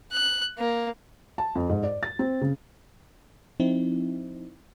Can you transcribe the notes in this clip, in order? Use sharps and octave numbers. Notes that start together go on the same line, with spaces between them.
F#6
A#3
A5
F2
G#2
D5
A6
C4
C#3
F3 C4 D#4 E4